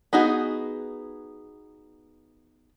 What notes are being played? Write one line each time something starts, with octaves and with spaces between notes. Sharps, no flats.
B3 D#4 F#4 G#4